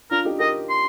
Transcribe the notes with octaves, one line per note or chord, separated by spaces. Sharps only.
D4 F4 A#4
D#4 G4
G4 A#4 D#5
C6